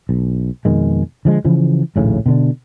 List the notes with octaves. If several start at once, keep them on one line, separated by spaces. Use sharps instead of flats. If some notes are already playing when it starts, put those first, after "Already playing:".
B1
F2 B2 D#3 G#3
D3 F3 G#3
C#3 E3 F3
A#1 D#2 A2 C#3
B2 D3 D4